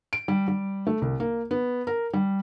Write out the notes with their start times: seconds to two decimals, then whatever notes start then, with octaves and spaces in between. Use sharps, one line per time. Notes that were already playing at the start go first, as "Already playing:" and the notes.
0.13 D7
0.28 G3
0.48 G3
0.87 A3
1.02 C2
1.20 A#3
1.51 B3
1.87 A#4
2.13 G3